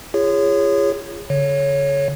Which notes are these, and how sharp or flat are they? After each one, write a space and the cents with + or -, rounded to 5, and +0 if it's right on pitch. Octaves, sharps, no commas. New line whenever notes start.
F4 -35 G#4 -25 C#5 +0
D3 -45 C#5 +0